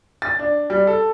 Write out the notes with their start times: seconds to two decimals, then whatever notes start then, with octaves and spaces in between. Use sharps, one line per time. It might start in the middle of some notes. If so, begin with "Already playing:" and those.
0.22 A6
0.39 D4
0.70 G3
0.87 A4